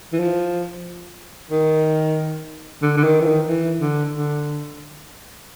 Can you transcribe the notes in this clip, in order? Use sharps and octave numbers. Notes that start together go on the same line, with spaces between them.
E3
F3
D#3
D3
D3
D#3
E3
D#3
E3
D3
D3